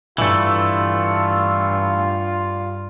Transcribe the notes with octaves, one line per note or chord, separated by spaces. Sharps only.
G2 E3 A3 F4